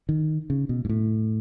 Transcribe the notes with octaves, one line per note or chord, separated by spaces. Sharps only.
D#3
C#3
B2
G#2
A2